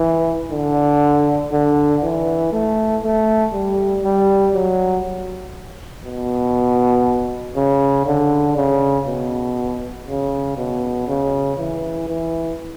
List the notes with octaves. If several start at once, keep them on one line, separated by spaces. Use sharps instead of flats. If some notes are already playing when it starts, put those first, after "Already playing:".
Already playing: E3
D3
D3
E3
A3
A3
G3
G3
F#3
B2
C#3
D3
C#3
B2
C#3
B2
C#3
E3
E3